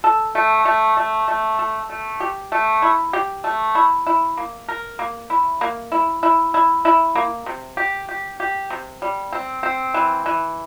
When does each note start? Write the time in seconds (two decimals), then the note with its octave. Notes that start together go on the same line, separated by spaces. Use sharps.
0.04 A4
0.35 A3
0.65 A3
0.97 A3
1.28 A3
1.59 A4
1.90 A3
2.20 G4
2.52 A3
2.82 E4
3.13 G4
3.44 A3
3.75 E4
4.07 E4
4.37 A#3
4.69 A#4
4.99 A#3
5.30 E4
5.61 A#3
5.92 E4
6.23 E4
6.54 E4
6.85 E4
7.16 A#3
7.46 C3
7.77 G4
8.09 G4
8.40 G4
8.70 C3
9.02 G3
9.33 C4
9.63 C4
9.94 E3
10.26 E3